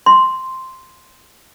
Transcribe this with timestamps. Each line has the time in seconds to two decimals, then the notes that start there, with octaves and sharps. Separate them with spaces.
0.06 C6